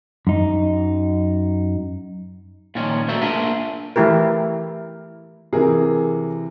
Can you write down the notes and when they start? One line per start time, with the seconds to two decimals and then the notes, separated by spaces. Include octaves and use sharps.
0.27 F#2 D#4
2.75 A#2 D#3 F3 C#4
3.08 A3 A#3 F#4 C5 D5 E5
3.21 A#3 D4 F4 G#4 A#4 E5
3.96 E3 A3 E4 G4 A#4
5.53 C3 E3 G#4 A#4